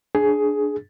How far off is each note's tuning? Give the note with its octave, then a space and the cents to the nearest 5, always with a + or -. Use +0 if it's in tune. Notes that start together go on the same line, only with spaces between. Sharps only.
D4 +0 G#4 +10